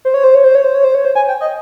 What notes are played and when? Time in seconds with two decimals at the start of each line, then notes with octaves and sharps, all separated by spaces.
0.05 C5
0.14 C#5
0.24 C5
0.35 C#5
0.44 C5
0.55 C#5
0.64 C5
0.75 C#5
0.84 C5
0.95 C#5
1.05 C5
1.15 G#5
1.28 G5
1.41 D#5